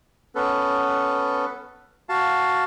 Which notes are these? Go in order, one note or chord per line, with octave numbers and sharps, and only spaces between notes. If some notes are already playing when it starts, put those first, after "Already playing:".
B3 C#4 A4 B4
F#4 F5 A5